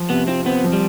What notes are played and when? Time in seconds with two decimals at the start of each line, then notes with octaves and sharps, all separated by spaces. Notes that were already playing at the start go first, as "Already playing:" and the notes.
Already playing: F3
0.10 C3 B3
0.28 C4 F4
0.46 B3 C4
0.64 F3
0.73 G3